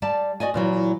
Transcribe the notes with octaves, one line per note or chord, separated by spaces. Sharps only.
G3 D5 A5
F#4 D5 D#5 G#5
A#2 E3 F#3